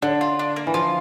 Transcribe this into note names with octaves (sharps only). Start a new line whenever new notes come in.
D3 D4
F4
D4
A#3
E3
F3 F4